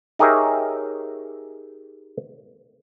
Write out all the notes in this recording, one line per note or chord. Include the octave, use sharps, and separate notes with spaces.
D#4 G4 G#4 A#4 C#5 E5